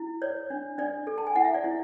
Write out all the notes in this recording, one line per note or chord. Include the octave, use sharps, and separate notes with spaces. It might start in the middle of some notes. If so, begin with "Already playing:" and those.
Already playing: E4
C#5 D5
D4
D4 D5
A4
A5
G#5
E4 F#5
E5
D5
E4